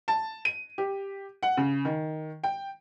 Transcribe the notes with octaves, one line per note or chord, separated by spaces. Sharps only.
A5
D#7
G4
F#5
C#3
D#3
G5